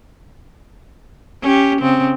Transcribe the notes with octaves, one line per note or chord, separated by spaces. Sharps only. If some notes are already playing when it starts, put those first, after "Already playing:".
C#4 G4
C#3 C4